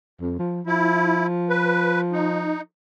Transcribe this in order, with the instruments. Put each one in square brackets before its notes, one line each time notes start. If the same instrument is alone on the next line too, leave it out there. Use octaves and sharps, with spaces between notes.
[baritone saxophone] F2
F3
[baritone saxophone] F3 [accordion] E4
[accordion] B4
D#4